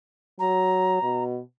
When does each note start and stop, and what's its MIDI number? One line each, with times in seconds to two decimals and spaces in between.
0.39 1.00 54
0.39 1.23 82
1.02 1.40 47